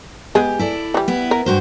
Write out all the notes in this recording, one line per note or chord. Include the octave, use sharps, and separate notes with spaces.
G#3 B3 G4 G#4
E4 A4 D5
E3 G3
B3 E4
A#4
G2 F#4 C5